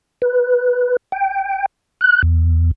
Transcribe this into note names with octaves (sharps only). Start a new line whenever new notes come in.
B4
G5
F#6
E2